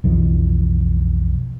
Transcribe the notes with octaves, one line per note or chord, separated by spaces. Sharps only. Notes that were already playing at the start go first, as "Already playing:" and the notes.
B1 F2 E3 F3